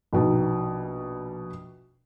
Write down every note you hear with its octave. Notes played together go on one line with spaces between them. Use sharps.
A#1 B2 D#4